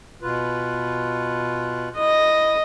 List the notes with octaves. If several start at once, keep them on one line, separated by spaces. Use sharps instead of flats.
B2 F4 B4
E4 D#5